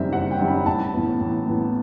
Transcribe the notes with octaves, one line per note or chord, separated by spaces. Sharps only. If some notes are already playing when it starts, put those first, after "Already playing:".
Already playing: F#1 F#2 D#3 G3 C4 E5
F#1 F#5
G5
F#2 D#3 G3 C4
B5
A1 A5
A2 E3 B3
A1
A2 E3 B3